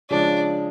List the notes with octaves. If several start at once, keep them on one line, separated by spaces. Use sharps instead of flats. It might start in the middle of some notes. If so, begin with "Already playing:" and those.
C#3 F3 G#3 D4